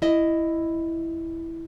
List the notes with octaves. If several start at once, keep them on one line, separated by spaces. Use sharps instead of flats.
E4 D#5